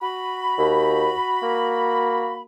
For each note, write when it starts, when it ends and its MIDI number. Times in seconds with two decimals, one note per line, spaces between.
0.02 2.42 66
0.02 2.42 83
0.58 1.11 39
1.43 2.43 58